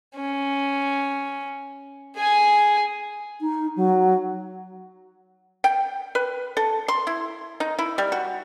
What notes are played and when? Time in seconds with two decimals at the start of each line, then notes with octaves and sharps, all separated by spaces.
0.15 C#4
2.17 G#4 G#5
3.41 D#4
3.76 F#3
5.64 G5
6.15 B4
6.57 A4
6.88 C6
7.07 E4
7.60 D#4
7.79 E4
7.98 G3
8.12 F#4